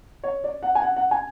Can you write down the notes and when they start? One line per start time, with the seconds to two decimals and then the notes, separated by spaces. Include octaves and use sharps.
0.24 C#5
0.44 D5
0.63 F#5
0.75 G#5
0.82 F#5
0.96 F#5
1.11 G#5